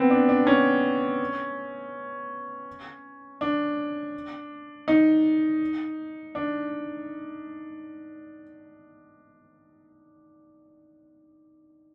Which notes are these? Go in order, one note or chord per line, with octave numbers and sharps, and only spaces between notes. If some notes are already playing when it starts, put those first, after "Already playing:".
Already playing: B3 C4
D4
D4
C#4
D4
D#4
D4